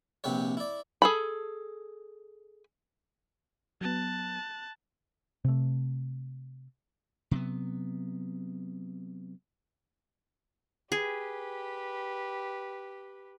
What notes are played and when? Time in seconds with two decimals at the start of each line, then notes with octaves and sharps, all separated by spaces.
0.24 A#1 C3 C4 B4 C#5
0.57 E4 D5
1.02 G#4 A4 B5
3.81 F#3 B3 A5 F#6
5.45 C3 A3
7.31 C3 F#3 B3
10.92 G4 G#4 B4